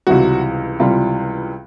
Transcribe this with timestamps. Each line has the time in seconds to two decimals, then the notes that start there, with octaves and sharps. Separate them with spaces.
0.07 C#2 C3 E3 G3 F#4
0.80 C#2 C3 E3 G3 F4